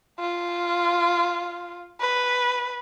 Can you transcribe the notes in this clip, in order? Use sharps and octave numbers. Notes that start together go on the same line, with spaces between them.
F4
B4